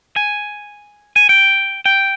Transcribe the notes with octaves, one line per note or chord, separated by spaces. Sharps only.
G#5
G#5
G5
G5